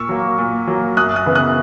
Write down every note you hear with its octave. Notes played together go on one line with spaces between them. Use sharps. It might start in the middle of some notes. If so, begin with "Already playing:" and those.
Already playing: A#2 C#6 E6
F#3 A#3
A#2
F#3 A#3
F#2 D#6 F#6
D#6 F#6
C#3 E3 B3
D#6 F#6